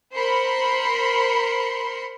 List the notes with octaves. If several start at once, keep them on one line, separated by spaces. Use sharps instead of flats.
A#4 C5 B5 C6 C#7